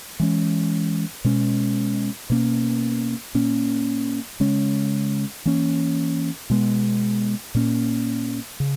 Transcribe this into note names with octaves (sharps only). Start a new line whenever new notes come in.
E3 G#3 C#4
B2 G#3 C#4
B2 A#3 C#4
A#2 A#3 C#4
C#3 G#3 C#4
E3 A#3 C#4
B2 G#3 B3
A#2 A#3 C#4
C#3